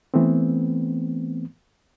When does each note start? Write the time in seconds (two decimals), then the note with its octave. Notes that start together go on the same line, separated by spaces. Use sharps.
0.14 E3 A3 B3 C4